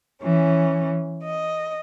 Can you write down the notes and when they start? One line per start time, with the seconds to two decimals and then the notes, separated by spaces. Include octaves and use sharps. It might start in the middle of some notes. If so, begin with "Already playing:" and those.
0.21 E3 C#4
1.23 D#5